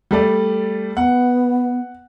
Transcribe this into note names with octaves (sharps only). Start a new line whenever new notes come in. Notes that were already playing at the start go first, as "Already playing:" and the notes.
G3 A3 D5
B3 F#5